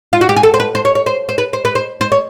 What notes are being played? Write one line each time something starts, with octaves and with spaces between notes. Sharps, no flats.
F4
F#4
G4
G#4
A4
C5
B4
C5
C#5
C#5
C5
C5
B4
C5
B4
C5
C5
C#5